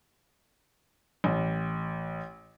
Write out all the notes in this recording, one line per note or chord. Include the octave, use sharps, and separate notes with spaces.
A1